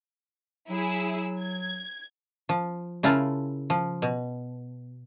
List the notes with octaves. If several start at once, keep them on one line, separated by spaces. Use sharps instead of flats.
F#3 E4 G#4 E6
G#6
F3
C#3 E4 F4 A#4 G#5 A5
F3
B2